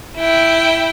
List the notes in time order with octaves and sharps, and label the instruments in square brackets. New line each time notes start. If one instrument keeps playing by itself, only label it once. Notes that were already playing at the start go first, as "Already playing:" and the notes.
[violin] E4 G5